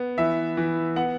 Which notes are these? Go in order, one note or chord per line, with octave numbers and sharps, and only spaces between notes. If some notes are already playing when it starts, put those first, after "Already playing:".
Already playing: B3
E3 E5
E3
B3 F#5